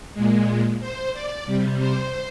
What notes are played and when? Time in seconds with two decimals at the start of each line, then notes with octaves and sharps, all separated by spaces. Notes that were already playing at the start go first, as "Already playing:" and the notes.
0.14 A#2 G#3
0.80 C5
1.13 D5
1.46 C3 G3
1.79 C5